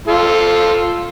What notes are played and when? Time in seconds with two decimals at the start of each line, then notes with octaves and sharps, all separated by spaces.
0.08 F4 A4